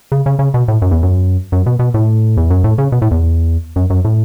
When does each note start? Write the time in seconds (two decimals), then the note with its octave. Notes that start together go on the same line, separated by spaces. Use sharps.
0.12 C#3
0.26 C#3
0.39 C#3
0.54 B2
0.68 A2
0.82 F#2
0.91 E2
1.03 F#2
1.52 F#2
1.66 B2
1.79 B2
1.94 A2
2.37 E2
2.50 F#2
2.64 A2
2.78 C#3
2.92 B2
3.02 A2
3.11 E2
3.76 F#2
3.90 F#2
4.05 A2